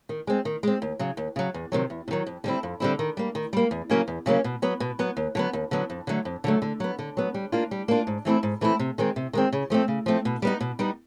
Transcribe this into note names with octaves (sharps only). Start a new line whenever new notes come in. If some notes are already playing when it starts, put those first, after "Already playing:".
D#3
G#3 C4
D#3
G#3 C4
D#2
C#3 F#3
D#2
C#3 F#3
E2
C3 D#3 F#3
E2
C3
D#3 F#3
F2
D3 G3 C4 E4
F2
D3 G3 C4 E4
D#3
G3 A#3
D#3
G3 A#3
E2
C#3 F#3 A#3 C#4
E2
C#3 F#3 A#3 C#4
B2
F#3 B3
B2
F#3 B3
D#2
D3 F#3 B3
D#2
D3 F#3 B3
F2
D3 F#3 A3
F2
D3 F#3 A3
D3
F#3 B3
D3
F#3 B3
G3
A#3 D4 F4
G3
A#3 D4 F4
G#2
E3 A3 C4 E4
G#2
E3 A3 C4 E4
C3
D#3 G#3 C4
C3
D#3 G#3 C4
C#3
F3 A3 C4
C#3
F3 A3 C4
B2
G3 B3 D#4
B2
G3 B3 D#4